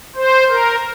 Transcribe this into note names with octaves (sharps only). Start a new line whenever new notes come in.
C5
A#4